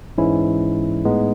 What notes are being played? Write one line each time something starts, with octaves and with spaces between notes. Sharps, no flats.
G#2 E3 G#3 C#4 E4
A2 G#3 B3 D#4